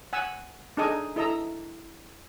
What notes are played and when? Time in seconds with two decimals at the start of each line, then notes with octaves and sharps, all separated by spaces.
0.13 F#5 G#5 E6
0.77 D4 D#4 G#4 A4 D#5 G#5
1.16 E4 A4 D#5 A#5 E6